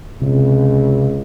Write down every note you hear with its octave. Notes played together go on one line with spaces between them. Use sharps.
C#2 C3